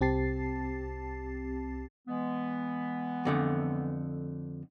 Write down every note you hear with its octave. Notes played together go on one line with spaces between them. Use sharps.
C2 C4 G4 A5 A6 C7
E3 G#3 B3
F2 D3 A3